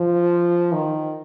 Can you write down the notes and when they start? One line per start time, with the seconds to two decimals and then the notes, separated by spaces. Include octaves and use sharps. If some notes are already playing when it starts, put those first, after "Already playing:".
Already playing: F3
0.72 D#3